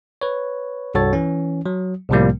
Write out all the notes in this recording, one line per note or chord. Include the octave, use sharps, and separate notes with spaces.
B4 C#5
C2 G2 F#4 A4 C#5 A6
E3 C#4
F#3
C2 A2 C3 F3 G3 A#3